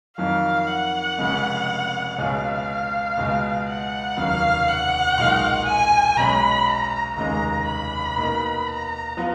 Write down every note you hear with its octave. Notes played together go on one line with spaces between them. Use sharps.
F2 D#3 F#3 F5
F#5
F1 F2 C#3 G#3
C#2 B2 G#3 C#4 F5
C#2 B2 G#3
F#5
F1 D#2 C#3 F#3 F5
F#5
B1 A#2 G#3 D#4
G#5
B1 B2 G#3 C#4 B5
A#5
F1 D#2 C#3 G#3 A#5
B5
B2 A#3 D#4
A#5
F3 B3 F4